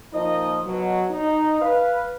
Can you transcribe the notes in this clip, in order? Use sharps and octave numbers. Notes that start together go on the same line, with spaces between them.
A#2 F3 A#3 D#4 D#5
B2 F#3
D#4
B4 F5